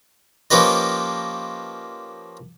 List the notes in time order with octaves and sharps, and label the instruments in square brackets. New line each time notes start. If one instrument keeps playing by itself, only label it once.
[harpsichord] F3 A#3 C#4 G4 B4 D#5